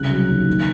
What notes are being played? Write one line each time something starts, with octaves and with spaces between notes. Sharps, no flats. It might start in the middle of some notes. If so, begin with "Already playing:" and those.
Already playing: C2 C#3 F#6
F#3
D#2
D#3